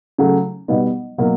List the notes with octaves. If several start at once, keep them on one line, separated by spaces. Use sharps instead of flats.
C#3 F#3 A3
B2 G3 B3 D#4
B2 F#3 A#3